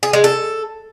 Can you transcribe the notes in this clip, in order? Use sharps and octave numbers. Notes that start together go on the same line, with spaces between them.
G#4
G#3
A4